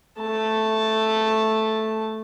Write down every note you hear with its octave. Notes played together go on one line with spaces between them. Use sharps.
A3 A5